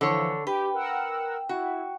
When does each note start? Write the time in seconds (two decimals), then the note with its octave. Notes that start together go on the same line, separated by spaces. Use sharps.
0.01 D3 E3 F3 A4 C#5
0.47 G4 B4 G5
0.74 A#4 F#5 E6
1.49 E4 F#4